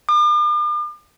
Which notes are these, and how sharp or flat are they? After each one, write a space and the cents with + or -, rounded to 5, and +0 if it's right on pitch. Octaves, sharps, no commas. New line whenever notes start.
D6 +45